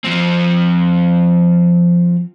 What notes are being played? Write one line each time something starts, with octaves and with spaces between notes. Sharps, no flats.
F3 C4